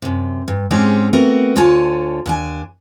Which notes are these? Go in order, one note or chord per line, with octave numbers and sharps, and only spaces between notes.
F#2 C3
G2
G#2 G#3 C4 C#4 D#4 G4
A3 B3 C4 F#4 A#4
D2 D3 F4 C#5 G#5 A5
D#2 D4 G#5